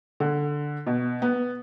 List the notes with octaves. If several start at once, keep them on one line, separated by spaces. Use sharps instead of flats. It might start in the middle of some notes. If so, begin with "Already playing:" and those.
D3
B2
B3